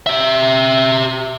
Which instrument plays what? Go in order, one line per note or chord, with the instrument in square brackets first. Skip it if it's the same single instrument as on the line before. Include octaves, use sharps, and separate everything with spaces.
[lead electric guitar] G4 E5